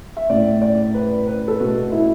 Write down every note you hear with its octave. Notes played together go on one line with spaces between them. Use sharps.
E5
A2 A3 D5
D5
B4
B4
A4
B2 A3 F#4
E4